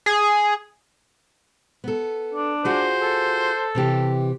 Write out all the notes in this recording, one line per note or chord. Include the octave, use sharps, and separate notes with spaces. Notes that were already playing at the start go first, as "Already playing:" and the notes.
G#4
B3 A4
D4
F4 F#4 G#4 C5
A4
C3 E3 G4